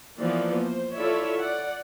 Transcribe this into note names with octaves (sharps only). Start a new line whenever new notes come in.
E3 F3 A#3 B3 D5
C5
E4 F4 A4 C#5 D5 E5
D5 F#5